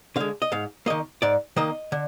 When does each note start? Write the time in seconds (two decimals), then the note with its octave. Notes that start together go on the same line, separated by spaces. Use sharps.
0.16 D3 G#3 F5
0.42 D#5
0.52 G#2 F5
0.86 D#3 A#3 D#5
1.22 G#2 D5
1.56 D#3 A#3 D#5
1.92 D3